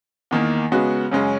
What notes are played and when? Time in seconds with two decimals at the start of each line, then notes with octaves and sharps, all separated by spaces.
0.31 E2 D#3 A#3
0.72 C#3 G#3 B3 F#4
1.11 F#2 C#3 G#3 C#4